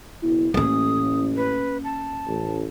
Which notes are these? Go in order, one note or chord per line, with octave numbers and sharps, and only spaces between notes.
F#1 B2 E4
A1 A2 A#3 C#4 D#6
B4
A5
A1